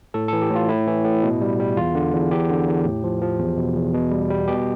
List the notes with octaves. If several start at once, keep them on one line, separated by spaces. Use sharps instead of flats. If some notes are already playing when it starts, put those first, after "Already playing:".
A2 A4
A4
E3
G4
A2
F4
A2 E4
E3
A2
B2
G3
G3
E2 F4
D3
E2
E2 G4
D3
E2
A2
F3
F3
E2
B2
E2
B2
G3
G3
B2 G4